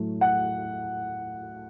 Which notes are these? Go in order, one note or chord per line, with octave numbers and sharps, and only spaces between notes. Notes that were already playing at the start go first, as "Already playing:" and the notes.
Already playing: A2 F#3 A3
F#5